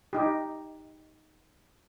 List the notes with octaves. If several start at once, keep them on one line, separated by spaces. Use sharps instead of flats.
D#4 G4